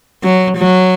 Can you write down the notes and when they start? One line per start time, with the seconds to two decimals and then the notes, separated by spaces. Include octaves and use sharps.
0.24 F#3
0.58 F#3